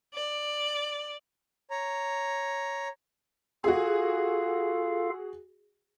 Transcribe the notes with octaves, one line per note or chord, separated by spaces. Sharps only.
D5
C#5 A#5
F4 F#4 G#4 A4 F5